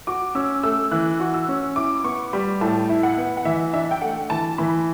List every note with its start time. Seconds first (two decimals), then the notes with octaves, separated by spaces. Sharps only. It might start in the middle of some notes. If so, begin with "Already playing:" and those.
0.07 F#4 D6
0.35 C#4 E6
0.63 A3 E6
0.91 E3 F#6
1.20 F#4
1.34 E6
1.48 C#4
1.76 E4 D6
2.04 B3 C#6
2.33 G3 B5
2.61 A2 A5
2.89 E4
3.03 F#5
3.17 B3
3.37 F#5
3.45 E3 E5
3.74 D4 E5
3.91 G5
4.02 A3 F#5
4.30 E3 A5
4.58 E3 B5